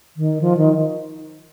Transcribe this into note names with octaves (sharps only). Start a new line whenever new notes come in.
D#3
F3
D#3